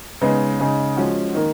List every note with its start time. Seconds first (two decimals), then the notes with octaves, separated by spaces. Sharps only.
0.21 C#3 G#3 B3 D#4
0.59 C#3 G#3 D#4 G#4
0.97 F3 G#3 C#4 F#4
1.35 D#3 A#3